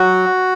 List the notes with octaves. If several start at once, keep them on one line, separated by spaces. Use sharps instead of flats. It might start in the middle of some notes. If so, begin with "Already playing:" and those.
Already playing: F#3 F#4